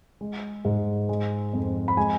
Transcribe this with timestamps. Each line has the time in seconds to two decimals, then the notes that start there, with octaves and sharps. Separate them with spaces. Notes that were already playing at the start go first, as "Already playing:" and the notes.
0.21 G#3
0.65 G#2
1.09 G#3
1.53 F2
1.88 B5
1.97 G#3 G#5